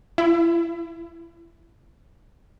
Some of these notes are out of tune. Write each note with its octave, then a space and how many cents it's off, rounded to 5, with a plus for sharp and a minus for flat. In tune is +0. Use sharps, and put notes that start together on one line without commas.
E4 +35